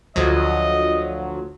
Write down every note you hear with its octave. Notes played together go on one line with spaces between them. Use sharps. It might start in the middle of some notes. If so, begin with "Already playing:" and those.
D2 F3 F#3 D#5